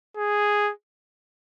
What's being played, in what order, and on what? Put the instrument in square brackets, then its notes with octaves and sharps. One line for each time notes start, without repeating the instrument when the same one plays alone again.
[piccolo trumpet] G#4